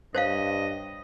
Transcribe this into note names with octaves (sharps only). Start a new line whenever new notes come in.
G2 C5 C#5 D#5 F5